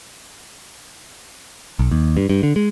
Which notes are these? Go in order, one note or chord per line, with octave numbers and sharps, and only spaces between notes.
B1
D#2
G2
G2
D3
G#3